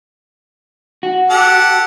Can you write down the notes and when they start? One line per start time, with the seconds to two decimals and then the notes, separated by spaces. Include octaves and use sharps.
1.03 F#4
1.30 G4 A4 F#5